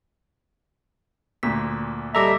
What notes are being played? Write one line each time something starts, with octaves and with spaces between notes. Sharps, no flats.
D2 A#2 B6
G3 A4 D#5 E5 A#5 D6 A#6